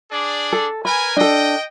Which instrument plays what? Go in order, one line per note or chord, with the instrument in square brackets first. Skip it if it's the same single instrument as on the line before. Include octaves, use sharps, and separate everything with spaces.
[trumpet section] D4 G#4 D5
[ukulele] A4
[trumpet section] A#4 B4 G#5 [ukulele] B5
[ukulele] D4 A4 [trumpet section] D#5 G5